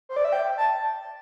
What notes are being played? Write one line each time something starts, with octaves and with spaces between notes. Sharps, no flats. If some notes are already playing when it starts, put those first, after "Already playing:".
C5
D5
E5
G5
A5